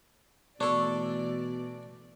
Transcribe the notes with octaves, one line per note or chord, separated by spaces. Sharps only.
B2 E3 A3 D4 A4 C#5 D5